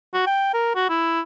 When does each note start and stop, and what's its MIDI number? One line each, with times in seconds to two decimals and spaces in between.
0.14 0.22 66
0.27 0.49 79
0.53 0.72 70
0.75 0.88 66
0.89 1.20 64